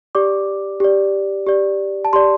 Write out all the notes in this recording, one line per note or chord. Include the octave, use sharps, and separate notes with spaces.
G4 D5 D6
G4 D5
G4 D5
A5
G4 D5 C6